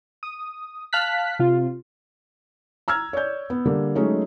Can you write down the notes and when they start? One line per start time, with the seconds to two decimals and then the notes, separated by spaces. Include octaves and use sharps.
0.23 D#6
0.93 F5 A5 F6 F#6 B6
1.39 C3 F4
2.88 A#5 E6 F6 G#6
3.13 C#5 D5 G6
3.50 B3
3.65 D3 G3 A#3
3.95 F#3 G#3 A3 C#4 D#4